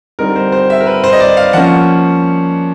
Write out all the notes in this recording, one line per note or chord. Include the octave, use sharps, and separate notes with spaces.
D3 G3 C4 D#4 A#4
C5
C5
E5
A#4
B4
C5
D#5
D5
F5
F3 A#3 C#4 F#5